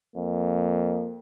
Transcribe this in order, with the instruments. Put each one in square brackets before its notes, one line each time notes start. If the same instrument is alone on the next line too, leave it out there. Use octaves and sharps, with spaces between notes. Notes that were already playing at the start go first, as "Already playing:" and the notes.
[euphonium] F2 [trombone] A#3